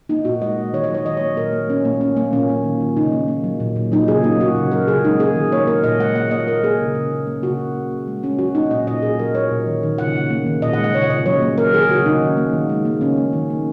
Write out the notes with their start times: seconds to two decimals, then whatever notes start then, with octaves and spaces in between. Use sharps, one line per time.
0.09 A#3 D#4
0.25 A#2 F#4
0.42 G#3 D#5
0.58 G#3
0.73 D#3 C#5
0.84 F#3 D#5
0.94 C#5
1.05 D#3 D#5
1.17 A#3 C#5
1.37 A#2 A#4
1.52 A#3
1.70 A#3 C#4
1.85 A#2 A#3
2.01 A#3 C#4
2.17 F#3 A#3
2.33 A#2 C#4
2.49 A#3
2.64 D#3
2.80 D#3
2.97 C#3 D#4
3.13 A#3
3.28 A#3
3.44 F#3
3.60 A#2
3.76 A#2
3.92 F#3 D#4
4.08 C#3 G#4
4.24 A#3 D#4
4.40 A#2 F#4
4.56 C#3
4.72 F#3 A#4
4.88 C#3 G#4
5.04 G#3 D#4
5.19 A#3 G#4
5.35 D#3
5.52 A#3 C#5
5.67 A#3 A#4
5.84 A#2 D#5
5.99 G#3 F#5
6.15 A#3 F#5
6.31 A#3 D#5
6.48 A#3 A#4
6.63 A#3 G#4
6.80 C#3
6.95 C#3
7.12 C#3
7.27 A#3
7.43 C#3 F#4
7.59 C#3
7.75 A#3
7.91 A#3
8.08 G#3
8.23 G#3 C#4
8.39 F#3 F#4
8.55 A#3 D#4
8.71 A#2 D#5
8.87 A#2 D#5
9.02 A#2 G#4
9.19 F#3 A#4
9.35 A#3 C#5
9.51 A#2
9.67 D#3
9.83 D#3
9.98 C#3 F#5
10.14 C#3
10.30 A#3
10.46 D#3
10.62 A#2 D#5
10.73 F#5
10.79 G#3
10.84 F#5
10.94 C#3 C#5
11.10 C#3 D#5
11.26 F#3 C#5
11.41 A#3
11.58 A#3 A#4
11.73 D#3 G#4
11.90 C#3 F#4
12.06 C#3 D#4
12.22 D#3
12.37 A#3
12.53 D#3
12.70 G#3
12.85 A#3
13.01 C#3 C#4
13.17 A#3
13.33 D#3
13.50 A#3